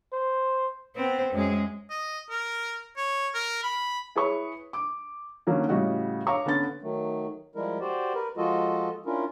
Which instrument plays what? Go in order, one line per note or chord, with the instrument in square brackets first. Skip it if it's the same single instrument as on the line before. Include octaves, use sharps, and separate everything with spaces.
[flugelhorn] C5
[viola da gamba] B3 C4 C5
F#2 G#3 G#4
[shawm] D#5
A#4
C#5
A#4
B5
[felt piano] E4 G#4 B4 C#5 C#6
D6
D3 D#3 F#3 A#3 C#4
A2 C#3 G3 F#4 D#5 F#5
C#5 F5 A#5 C#6 D6
D3 B3 C#4 A6
[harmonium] D#3 F#3 A3
F3 G3 G#3 E4 A#4
F#4 G4 C5 D5
A#4 B4
F3 G#3 F4 F#4 A4 D#5
C#4 D4 E4 F4 A#4